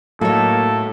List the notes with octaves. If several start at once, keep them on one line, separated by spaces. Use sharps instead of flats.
A2 F#3 A#3 D#4 A4 C#5